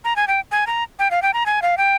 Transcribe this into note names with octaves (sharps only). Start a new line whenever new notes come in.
A#5
G#5
G5
G#5
A#5
G5
F5
G5
A#5
G#5
F5
G5